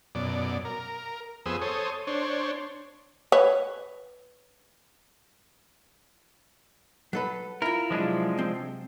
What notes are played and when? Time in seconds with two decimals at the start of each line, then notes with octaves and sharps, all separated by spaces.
0.15 F#2 B2 D5
0.65 A#4
1.46 F2 B3 G#4 C5 D#6 E6
1.61 A4 C5 C#5 D#6
2.07 D4 C5 C#5
3.32 B4 C#5
7.13 F#3 A4 B4
7.62 E4 F4 A#4
7.91 C3 F3 F#3 G#3 D4
8.38 C4